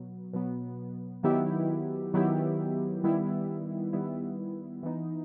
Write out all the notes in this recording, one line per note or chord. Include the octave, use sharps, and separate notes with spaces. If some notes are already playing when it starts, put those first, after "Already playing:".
Already playing: B2 F#3 B3
B2 F#3 B3
D#3 F#3 B3 E4 G4
D#3 F#3 B3 E4 G4
D#3 G3 B3 E4
D#3 G3 B3 E4
E3 B3 D#4